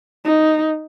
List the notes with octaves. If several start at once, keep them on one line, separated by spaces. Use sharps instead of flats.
D#4